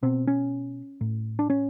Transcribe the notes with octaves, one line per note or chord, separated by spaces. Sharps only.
B2 C4
C#4
A2
D4
C#4